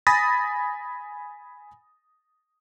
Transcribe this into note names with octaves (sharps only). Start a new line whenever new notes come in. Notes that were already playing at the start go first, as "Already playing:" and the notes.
G#5 B5 D#6 A6 A#6